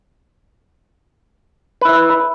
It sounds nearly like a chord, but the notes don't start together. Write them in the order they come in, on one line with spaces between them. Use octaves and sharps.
B4 E4 E5